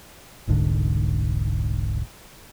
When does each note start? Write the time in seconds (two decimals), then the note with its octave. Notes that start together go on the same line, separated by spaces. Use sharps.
0.47 E1 C2 G#2 D3